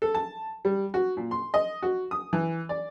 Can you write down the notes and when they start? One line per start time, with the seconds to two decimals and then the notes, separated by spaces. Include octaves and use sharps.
0.02 A4
0.15 A5
0.65 G3
0.94 F#4
1.17 A#2
1.31 C6
1.54 D#5
1.82 F#4
2.11 D#6
2.33 E3
2.69 D5